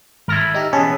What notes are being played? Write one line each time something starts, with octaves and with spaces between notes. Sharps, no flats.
G#1 E4 A4 A#4 A#6
B5
D#4 G4 A#5
B2 E3 B3 C#4 G#4 A5